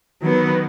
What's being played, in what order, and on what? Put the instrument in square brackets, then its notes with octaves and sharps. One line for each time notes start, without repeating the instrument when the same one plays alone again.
[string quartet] D#3 F#3 B3